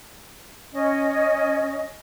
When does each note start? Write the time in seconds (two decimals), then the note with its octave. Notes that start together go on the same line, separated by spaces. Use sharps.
0.73 C#4 D#5